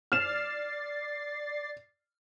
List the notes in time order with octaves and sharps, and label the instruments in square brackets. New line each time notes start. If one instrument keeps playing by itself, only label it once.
[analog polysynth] D5 A6 C7 [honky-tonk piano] F6 E7